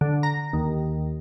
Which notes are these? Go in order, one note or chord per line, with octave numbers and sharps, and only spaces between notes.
D3
A#5
D#2